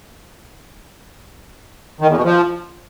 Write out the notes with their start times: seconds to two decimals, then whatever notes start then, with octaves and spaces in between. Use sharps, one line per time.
2.01 D#3
2.08 E2
2.16 B2
2.24 F3